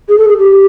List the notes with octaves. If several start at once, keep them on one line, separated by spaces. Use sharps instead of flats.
G#4
A4
G#4
G4